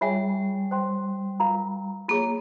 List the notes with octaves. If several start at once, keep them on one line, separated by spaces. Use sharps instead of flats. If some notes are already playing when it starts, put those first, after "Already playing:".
G3 F4 G#4 C#5 E5 G#5
C5 G5 C6
F4 A#4 F5 A#5
A#3 F4 G#4 C#5